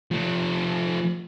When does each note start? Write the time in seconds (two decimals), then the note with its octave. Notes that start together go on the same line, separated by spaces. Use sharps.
0.12 F3 A3